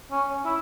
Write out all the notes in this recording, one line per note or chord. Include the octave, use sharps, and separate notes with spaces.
C#4
E4